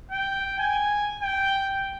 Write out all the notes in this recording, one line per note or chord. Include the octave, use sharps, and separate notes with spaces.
G5
G#5
G5